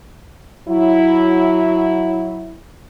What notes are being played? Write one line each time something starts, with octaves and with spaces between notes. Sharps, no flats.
F#3 E4